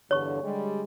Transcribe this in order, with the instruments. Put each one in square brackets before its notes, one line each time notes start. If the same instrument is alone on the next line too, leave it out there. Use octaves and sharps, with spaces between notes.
[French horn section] E2 G2 D3 [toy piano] C#5 C#6
[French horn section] D3 G3 G#3